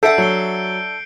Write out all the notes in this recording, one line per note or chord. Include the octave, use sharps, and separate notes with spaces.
D4 A4 E5 F#5 G6 C7 D7
F#3 G6 C#7 G7